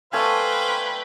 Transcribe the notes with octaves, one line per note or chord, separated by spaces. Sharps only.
A3 B4 C5 D5 F5 G5 G#5